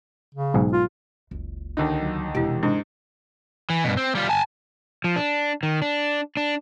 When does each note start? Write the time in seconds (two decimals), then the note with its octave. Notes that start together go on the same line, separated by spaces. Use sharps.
0.34 C#3
0.54 B1 G#2 G#4
0.73 F4
1.31 F#1 C#2
1.77 D#2 D3 D#4
2.02 F#3
2.35 E1 C3 E3 E4 G4
2.63 G#2 D4
3.70 E3
3.84 G2 B2
3.97 C4
4.15 G3 F4
4.30 G#5 A5
5.04 F3
5.16 D4
5.63 D#3
5.82 D4
6.37 D4